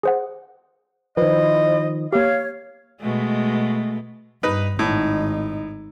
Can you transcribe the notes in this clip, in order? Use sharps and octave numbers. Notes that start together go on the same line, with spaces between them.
G#4 C5 F#5
D#3 F3 E4 B4 C5 D#5
A#3 G4 C#5 F5
B2 G#3 A3
G2 D#4 B4
G#1 A2 D#4